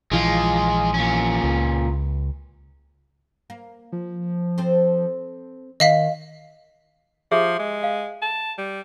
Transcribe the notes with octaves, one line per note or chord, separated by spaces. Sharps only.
A#1 E3 F3 G#3 F4
A#2 C#4
C#2
A#3
F3
C4 A4 C5
D#3 D#5 F5 B6
F3 G4 G#4 E5
G#3
F5
A5
G3